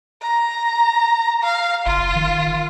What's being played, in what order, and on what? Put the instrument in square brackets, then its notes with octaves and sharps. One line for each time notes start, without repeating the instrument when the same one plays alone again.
[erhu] A#5
F5
[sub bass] F#1 [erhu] F4
[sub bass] D#3